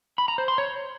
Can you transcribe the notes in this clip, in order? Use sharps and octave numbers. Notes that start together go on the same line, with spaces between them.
B5
A#5
C5
C6
C#5